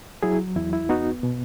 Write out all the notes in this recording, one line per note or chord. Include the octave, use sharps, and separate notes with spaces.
F#3 E4 G#4
E2 E4
E4
B3 D#4 F#4
B2